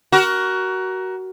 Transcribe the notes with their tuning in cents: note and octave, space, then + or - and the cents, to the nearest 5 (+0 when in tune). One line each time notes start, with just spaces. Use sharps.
F#4 +20 A#4 +15